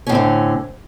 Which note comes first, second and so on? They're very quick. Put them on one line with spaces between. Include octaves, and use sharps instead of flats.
C#4 A2 C4 D3